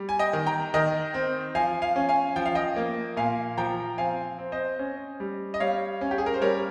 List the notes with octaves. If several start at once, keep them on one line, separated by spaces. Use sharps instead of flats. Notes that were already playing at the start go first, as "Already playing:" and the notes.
Already playing: G3
G#5
D#5 G5
D#3
G5 A#5
D#3 D#5 G5
C4
F3 F5 G#5
F5 G#5
C#4
F5 G#5
F3 G5
F5
D#5 G5
A#3
A#2 F5 G#5
F3 G5 A#5
C4 F5 G#5
C4
C5 D#5
C#4
G3
D#5
G3 C#5 F5
C#4
G4
G#4
A#4
C5
G3 A#4 C#5